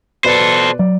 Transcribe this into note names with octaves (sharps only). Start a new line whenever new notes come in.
B2 A4 B4 C5 D5
F#3 D5